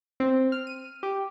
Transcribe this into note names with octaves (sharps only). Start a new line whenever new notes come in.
C4
F6
D#7
G4